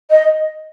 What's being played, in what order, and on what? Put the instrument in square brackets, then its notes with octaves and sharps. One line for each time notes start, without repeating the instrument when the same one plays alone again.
[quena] D#5